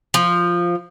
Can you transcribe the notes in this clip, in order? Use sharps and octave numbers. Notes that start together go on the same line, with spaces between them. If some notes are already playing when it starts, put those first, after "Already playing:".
F3